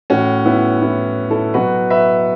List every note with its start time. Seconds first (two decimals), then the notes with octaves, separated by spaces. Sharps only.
0.10 A2 E3 C#4 F#4
0.46 B3 E4
0.82 B3 E4
1.30 E4 A4
1.54 B2 F#3 F#4 B4
1.90 B4 E5